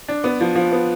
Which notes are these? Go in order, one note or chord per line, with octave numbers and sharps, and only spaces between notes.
D4
B3
F3
F3
B3